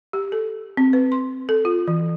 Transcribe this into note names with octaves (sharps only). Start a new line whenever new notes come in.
G4
A4
C4
B4
C6
A4
F4
E3